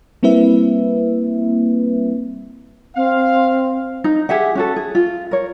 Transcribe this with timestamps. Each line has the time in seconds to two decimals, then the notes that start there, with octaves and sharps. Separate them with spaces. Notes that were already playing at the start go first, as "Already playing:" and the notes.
0.23 G3 A#3 C4 E4 B4 E5
2.96 C4 F5
4.04 D#4
4.29 G4 G#4 E5 F#5
4.55 C#4 F#4 A4
4.76 G#4
4.95 F4
5.31 A#4 C#5